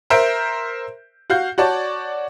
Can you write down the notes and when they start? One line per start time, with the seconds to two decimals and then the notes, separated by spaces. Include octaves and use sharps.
0.10 A#4 C5 E5 G6 D7
1.30 F#4 F5 G6
1.58 F#4 C#5 D5 A5